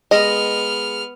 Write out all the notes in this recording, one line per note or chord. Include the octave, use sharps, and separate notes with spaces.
G#3 B3 D#5 F6